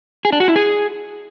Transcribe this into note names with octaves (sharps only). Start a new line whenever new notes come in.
G#4
D4
F#4
E4
G#4